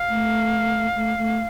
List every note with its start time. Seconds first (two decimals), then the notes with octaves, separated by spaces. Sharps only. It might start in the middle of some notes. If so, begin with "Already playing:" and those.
Already playing: F5
0.08 A3
0.95 A3
1.18 A3